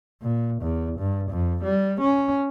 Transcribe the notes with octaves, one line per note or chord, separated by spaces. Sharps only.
A#2
E2
G2
F2
G3
C#4